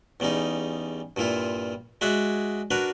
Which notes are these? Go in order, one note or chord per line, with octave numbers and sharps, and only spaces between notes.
E2 C#3 G3 D#4
G2 A#2 E4 F4
G#3 F#4 G#4 D5 E5 F#5
D4 F#4 A#4 B4